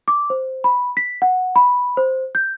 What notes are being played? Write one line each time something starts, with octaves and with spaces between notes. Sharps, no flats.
D6
C5
B5
B6
F#5
B5
C5
G6